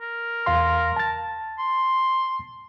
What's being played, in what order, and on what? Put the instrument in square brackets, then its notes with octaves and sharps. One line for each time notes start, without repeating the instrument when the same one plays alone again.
[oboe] A#4
[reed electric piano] E2 F5 C6
A5 A6
[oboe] C6